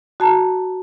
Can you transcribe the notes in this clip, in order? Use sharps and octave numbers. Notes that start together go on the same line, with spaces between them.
F#4 A5 A#5